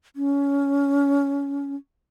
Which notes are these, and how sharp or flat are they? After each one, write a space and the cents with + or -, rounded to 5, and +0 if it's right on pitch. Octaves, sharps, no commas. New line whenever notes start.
C#4 +20